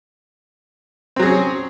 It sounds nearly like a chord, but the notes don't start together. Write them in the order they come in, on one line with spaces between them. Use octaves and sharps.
C4 F#3 G#4 C#4